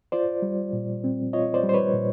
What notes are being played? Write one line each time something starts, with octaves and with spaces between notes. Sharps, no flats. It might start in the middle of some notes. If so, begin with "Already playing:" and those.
F4 C5 D5
G3
A#2
C4
F4 C#5 D#5
C5 D5
G3
C5
B4 C#5
A#2